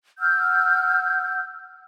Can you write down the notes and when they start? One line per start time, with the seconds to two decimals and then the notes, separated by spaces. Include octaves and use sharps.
0.18 F#5 E6 F6 G6